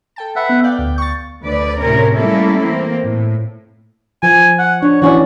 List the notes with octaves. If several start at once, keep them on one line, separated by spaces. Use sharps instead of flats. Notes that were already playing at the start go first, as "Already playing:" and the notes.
A4 G5 A5
B4 E5 F#5
B3
D5 F5 G5
D2
C#6 A6
D2 B4 D5
A2 C3 C4 C#4 A#4
G3 A3 A#3 C#4 E4 A4
E3 A#3 C4
A2
F3 G#5
F#5
D4 C#5
E3 C#4 F#4 D5